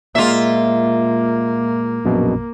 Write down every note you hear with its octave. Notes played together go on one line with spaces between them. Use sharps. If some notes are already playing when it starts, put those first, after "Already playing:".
A#2 G#3 A#3 F4 E5
A#1 F#2 B2